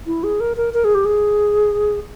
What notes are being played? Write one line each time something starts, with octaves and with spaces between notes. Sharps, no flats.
E4
G#4
A#4
A#4
A#4
G#4
G4
G#4